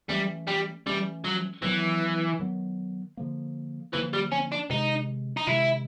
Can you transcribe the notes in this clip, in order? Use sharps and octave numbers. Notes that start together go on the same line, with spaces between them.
E3 G3 A3 C#4
G3
E3 G3 A3 C#4
F#3
D#3 E3 F#3 B3
D#3 F#3 B3
D3 F3 A#3
D3 E3 F3 A#3
G3
C#4
D4
C3 D#3 G#3 D#4
D#4
C3 D#3 G#3 E4